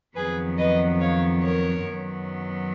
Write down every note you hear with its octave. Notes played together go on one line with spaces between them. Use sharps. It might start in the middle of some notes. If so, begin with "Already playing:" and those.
F2 D#3 F#3 B3 G#4 B4
B4 D#5
C#5 F5
A#4 C#5
F#2 D#3 F#3 B3